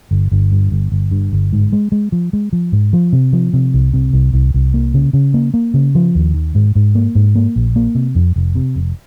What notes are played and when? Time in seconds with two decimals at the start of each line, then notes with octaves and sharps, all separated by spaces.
0.11 G1
0.32 G1
0.52 G2
0.72 G1
0.92 G1
1.11 G2
1.33 G1
1.53 G#2
1.73 G#3
1.92 G#3
2.12 F3
2.33 G#3
2.53 F3
2.72 G#2
2.93 F3
3.13 C3
3.33 F3
3.53 C3
3.74 C2
3.93 C3
4.13 C2
4.33 C2
4.54 C2
4.74 A#3
4.94 C#3
5.13 C#3
5.34 A#3
5.54 A#3
5.74 C#3
5.95 F3
6.15 D#2
6.34 D#3
6.55 G#2
6.75 G#2
6.95 A#3
7.15 G#2
7.35 A#3
7.56 A#1
7.76 A#3
7.95 C3
8.15 F2
8.36 F1
8.55 C3
8.76 F1